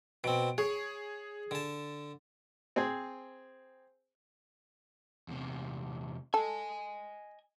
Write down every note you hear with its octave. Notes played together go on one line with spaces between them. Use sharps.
B2 C4 D7
G#4 C#5
D3 A5
C4 G#4
E2 C3
A4 D#5 G#5